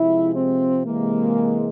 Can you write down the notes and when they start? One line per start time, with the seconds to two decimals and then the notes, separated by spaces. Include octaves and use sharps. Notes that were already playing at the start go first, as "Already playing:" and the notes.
Already playing: C3 F3 G#3 E4
0.36 C4
0.86 C3 E3 G#3 A#3